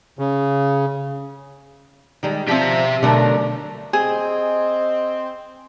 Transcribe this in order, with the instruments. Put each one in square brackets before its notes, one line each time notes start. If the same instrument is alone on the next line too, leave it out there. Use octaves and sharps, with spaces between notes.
[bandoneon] C#3
[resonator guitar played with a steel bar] D#3 G3 G#3
[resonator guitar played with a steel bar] F3 C4 [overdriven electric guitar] G4 E5
[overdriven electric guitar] B1 [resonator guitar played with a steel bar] D3 A3 A#4
[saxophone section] C4 [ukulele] G#4 [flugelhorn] D#5 [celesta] G#5